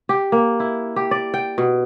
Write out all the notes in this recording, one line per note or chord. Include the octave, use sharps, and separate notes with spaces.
G4
A#3
E4
G4
D5
G5
B2